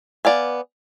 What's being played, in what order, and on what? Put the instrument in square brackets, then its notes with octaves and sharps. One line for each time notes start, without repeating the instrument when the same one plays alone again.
[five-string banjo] B3 D5 F5 G#5